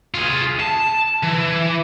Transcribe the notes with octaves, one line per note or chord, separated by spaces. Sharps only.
F4 G#4
A5
E3